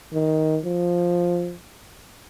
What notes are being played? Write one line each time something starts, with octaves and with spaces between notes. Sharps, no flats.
D#3
F3